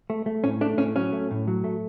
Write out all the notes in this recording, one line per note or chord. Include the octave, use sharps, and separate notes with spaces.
A3
A3
A2 C#4
A3 D4
A2 C#4
F#3 C#4
A3
A2
F#3
A3